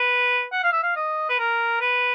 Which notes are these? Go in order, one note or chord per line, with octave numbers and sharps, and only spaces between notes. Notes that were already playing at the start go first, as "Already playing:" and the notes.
Already playing: B4
F#5
F5
E5
F5
D#5
B4
A#4
B4